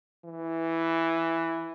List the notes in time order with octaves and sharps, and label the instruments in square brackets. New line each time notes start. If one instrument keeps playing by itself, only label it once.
[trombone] E3